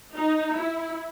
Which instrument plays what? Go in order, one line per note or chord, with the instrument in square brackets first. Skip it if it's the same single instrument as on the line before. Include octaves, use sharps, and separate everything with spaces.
[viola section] D#4
E4